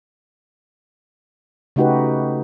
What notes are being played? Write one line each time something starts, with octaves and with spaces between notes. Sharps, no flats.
C#3 A3 D#4 F#4 G4 B4